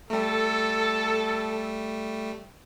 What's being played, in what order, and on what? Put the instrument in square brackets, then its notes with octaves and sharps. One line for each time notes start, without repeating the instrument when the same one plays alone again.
[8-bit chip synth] G3 A3 [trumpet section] A4